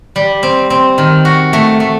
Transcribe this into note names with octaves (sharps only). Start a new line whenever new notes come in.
G3
C4
C4
D#3
F#4
A3
A3